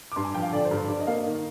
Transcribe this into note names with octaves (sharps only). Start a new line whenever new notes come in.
D6
G2 C6
G#5
F3 G5
F5
D3 D5
C5
G2
C5
G2 D5
D#5
A#3 F5
D#5
D#3